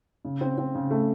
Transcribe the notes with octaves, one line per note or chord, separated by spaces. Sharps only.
C#3
C4
C4
C#3
A3